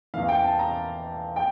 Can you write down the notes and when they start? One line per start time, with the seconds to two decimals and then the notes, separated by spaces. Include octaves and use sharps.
0.14 E2 E3 F5
0.28 G5
0.44 A5
0.59 A#5
1.36 G5